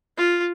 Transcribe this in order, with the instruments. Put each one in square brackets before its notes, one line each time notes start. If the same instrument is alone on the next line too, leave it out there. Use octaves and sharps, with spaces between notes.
[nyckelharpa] F4